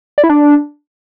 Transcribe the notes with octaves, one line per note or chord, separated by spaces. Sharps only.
D5
E4
D4